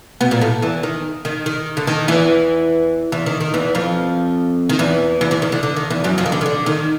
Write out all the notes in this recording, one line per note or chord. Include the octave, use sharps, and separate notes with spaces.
B2 B3
A#2 A#3
A2 A3
E2 E3
D#3
D#3
D#3
D3
D#3
E2 E3
E2 E3
D#3
D#3
E2 E3
F2 F3
D#3
E2 E3
E2 E3
E2 E3
D#3
D3
D3
D#3
E2 E3
F#2 F#3
F2 F3
D#3
D3
D#3
D3
D#3